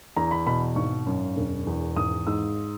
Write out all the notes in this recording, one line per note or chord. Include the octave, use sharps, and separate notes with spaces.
E2 A#5
B5
B2 B5
G#1 C#6
F#2
E1
E2
G#1 D#6
G#2 E6